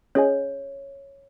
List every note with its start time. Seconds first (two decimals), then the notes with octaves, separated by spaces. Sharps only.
0.15 C#4 G#4 C#5 D#5 G#5